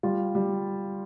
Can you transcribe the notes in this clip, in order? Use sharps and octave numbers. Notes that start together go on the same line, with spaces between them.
G3 F4
G3